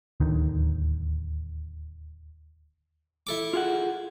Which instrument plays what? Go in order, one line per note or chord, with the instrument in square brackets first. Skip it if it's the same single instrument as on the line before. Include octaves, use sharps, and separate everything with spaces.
[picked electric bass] D1 D#2 D3 D#3
[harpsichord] E4 A4 D6
[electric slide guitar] F4 G#4 F#5